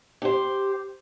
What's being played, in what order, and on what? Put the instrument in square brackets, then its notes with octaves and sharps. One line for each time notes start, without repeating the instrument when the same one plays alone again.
[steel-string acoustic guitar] G4 C5